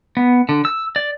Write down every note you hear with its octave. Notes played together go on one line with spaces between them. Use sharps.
B3
D3
E6
D5